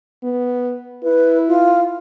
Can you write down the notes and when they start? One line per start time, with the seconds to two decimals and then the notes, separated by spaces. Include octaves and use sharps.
0.23 B3
1.03 E4 B4
1.48 F4